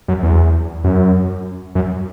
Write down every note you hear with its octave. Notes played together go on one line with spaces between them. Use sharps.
F#2
E2
F#2
F#2